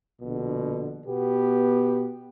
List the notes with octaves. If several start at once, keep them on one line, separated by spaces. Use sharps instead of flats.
A#1 B2 D3
B2 B3 G4